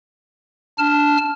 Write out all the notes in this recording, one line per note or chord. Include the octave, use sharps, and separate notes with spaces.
D4 A5 F6